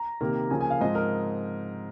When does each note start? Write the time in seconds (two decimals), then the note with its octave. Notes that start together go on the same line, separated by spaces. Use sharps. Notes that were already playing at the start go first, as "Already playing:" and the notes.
Already playing: A#5
0.21 C3 D#3 A#3
0.50 C#3 F3 A#3 C#4 G#5
0.61 G#5
0.70 F5
0.80 G#2 F3 C4 D#5
0.95 A#4